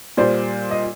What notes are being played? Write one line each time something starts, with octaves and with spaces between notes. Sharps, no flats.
A#2 G3 C5 D5
D#5